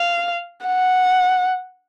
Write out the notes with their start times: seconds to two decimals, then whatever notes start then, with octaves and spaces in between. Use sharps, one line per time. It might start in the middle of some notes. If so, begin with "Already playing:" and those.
Already playing: F5
0.67 F#5